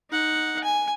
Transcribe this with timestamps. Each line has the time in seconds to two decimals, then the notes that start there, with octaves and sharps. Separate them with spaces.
0.10 D#4 F#5
0.64 G#5